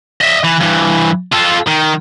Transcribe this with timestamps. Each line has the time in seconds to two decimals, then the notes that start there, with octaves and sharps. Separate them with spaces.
0.21 D#5 E5
0.44 E3
0.61 G2 E3
1.32 F4 A4
1.67 D#3